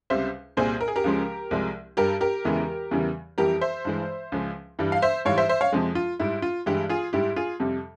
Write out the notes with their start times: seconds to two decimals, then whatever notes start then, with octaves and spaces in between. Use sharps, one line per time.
0.10 C#2 C3 G3 C5 E5
0.57 C2 A#2 G3 G#4 C5
0.81 A#4
0.88 G#4
0.96 G4 A#4
1.04 C#2 C#3 F3 G#3
1.51 C2 C3 F3 G#3
1.97 G2 G3 G4 A#4
2.21 G4 A#4
2.45 E2 C#3 E3 G#3
2.91 E2 C#3 E3 G3
3.38 F2 E3 G3 G4 A#4
3.61 C5 E5
3.85 G2 E3 G#3
4.32 C#2 C#3 F3 G#3
4.79 G2 E3 G3
4.92 F5
5.02 C5 E5
5.25 G#2 E3 G3 C#5 F5
5.38 C5 E5
5.49 C5 E5
5.61 C#5 F5
5.72 F2 C3 F3 G#3
5.95 F4
6.19 G#2 G3 E4
6.42 F4
6.66 G2 E3 G#3 E4 G4
6.89 F4 G#4
7.13 G#2 G3 E4 G4
7.36 F4 G#4
7.60 F2 C3 G3